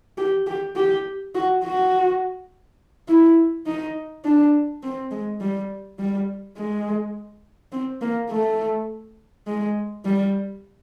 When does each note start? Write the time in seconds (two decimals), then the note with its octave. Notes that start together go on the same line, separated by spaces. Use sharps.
0.18 G4
0.47 G4
0.76 G4
1.35 F#4
1.64 F#4
3.09 E4
3.66 D#4
4.25 D4
4.83 C4
5.12 G#3
5.41 G3
5.99 G3
6.57 G#3
7.72 C4
8.02 A#3
8.30 A3
9.48 G#3
10.06 G3